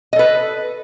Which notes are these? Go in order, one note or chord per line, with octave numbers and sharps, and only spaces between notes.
A4 B4 D#5